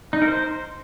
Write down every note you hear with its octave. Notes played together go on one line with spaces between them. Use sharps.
D#4
A#4
C5